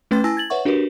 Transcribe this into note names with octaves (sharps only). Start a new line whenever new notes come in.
A3 C#4 B4 G5 C6 A6
E4 G#5 A5 E6 A#6
G#6 A6 F#7
B4 C#5 E5 F#5 C#6
D4 F#4 G4 A#4 B4